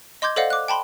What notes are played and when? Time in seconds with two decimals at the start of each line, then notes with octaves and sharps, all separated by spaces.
0.22 D#5 C6 D6 G6 G#6
0.36 A4 C5 D5 D#5 F5 F#5
0.50 D6 F#6
0.68 G5 A5 B5 C6